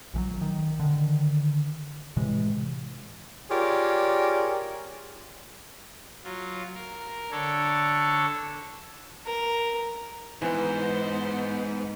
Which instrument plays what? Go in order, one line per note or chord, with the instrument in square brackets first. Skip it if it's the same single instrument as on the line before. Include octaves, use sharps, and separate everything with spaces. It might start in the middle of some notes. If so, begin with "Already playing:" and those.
[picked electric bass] A#1 E3 F#3
D#3
D3 D#3
A2 C3 E3 G#3
[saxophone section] F4 G4 G#4 A#4 C#5 D5
[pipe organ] F#3 F4
A#4
D3 D4 A4 C#5
[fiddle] A#4
[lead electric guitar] G#2 [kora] E3 [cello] B3 [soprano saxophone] C5